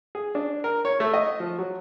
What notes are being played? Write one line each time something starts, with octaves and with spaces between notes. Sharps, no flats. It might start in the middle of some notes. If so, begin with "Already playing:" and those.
G#4
D4
A#4
C#5
A3
D#5
F3
F#3